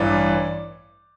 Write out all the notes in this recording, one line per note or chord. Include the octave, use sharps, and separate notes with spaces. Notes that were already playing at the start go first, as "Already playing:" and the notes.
Already playing: A1 G2 E3 D5